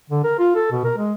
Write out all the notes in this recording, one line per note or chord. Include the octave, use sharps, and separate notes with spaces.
D3
A#4
F4
A4
B2
A#4
G#3